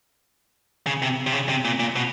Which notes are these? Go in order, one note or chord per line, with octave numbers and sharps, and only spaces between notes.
C#3
C3
C3
C#3
C3
A#2
A#2
B2